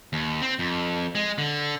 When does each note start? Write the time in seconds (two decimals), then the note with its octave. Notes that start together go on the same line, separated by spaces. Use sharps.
0.13 D#2
0.42 C4
0.59 F2
1.15 G#3
1.38 D3